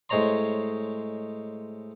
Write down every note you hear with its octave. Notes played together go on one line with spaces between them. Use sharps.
A2 G#3 C5 C#5 A#5 C6